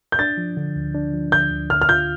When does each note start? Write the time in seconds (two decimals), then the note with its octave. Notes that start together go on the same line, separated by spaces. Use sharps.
0.12 G6
0.19 D4 A6
0.38 F3
0.57 D3
0.76 D2
0.95 D4
1.14 F3
1.32 D3 G6
1.51 D2
1.70 D3 F6
1.82 F6
1.89 F4 G6